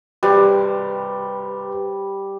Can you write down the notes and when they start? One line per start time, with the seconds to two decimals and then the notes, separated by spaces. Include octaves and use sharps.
0.23 G3 G4 B4 C5